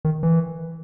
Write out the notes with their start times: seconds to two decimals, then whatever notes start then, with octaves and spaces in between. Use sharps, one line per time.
0.05 D#3
0.23 E3